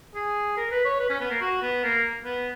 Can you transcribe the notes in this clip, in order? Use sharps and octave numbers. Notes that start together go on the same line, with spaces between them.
G#4
A#4
B4
C#5
B4
C#4
B3
A#3
F#4
B3
A#3
B3